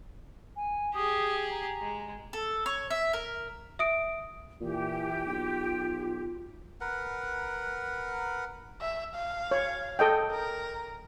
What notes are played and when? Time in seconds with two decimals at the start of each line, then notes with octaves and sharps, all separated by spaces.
0.56 G#5
0.94 G4 G#4 D#6
1.51 A#5
1.81 G#3
2.33 A4
2.66 C#5
2.91 E5
3.13 A#4
3.79 E5 D#6 D7
4.61 A#2 E3 G4
5.27 B1 F4
6.81 A#4 B4 F#5
8.81 E5
9.15 F5
9.51 C#5
9.99 A4 D#5 G5
10.31 A#4